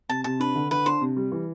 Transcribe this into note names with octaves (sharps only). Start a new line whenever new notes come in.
C3 A5
C3 A5
D4 B4
D3
D3 B4
D4 C5
C3
G3
E3